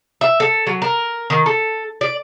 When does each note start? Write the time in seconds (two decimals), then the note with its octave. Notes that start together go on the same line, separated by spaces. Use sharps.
0.21 E5
0.40 A4
0.67 F#3
0.82 A#4
1.30 D#3
1.46 A4
2.01 D5